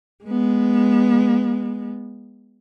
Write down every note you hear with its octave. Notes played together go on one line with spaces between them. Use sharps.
G#3 B3